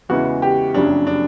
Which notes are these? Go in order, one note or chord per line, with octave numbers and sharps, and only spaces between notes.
E2 C#3 E3 G#3 F#4
G4
F#1 F2 C#3 F#3 D4
D4